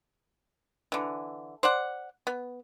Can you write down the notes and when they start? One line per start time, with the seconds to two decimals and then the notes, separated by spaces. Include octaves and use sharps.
0.92 D3 E3
1.63 C5 D5 F#5
2.27 B3